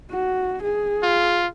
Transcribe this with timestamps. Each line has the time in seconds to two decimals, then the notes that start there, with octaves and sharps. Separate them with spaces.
0.11 F#4
0.62 G#4
1.03 F4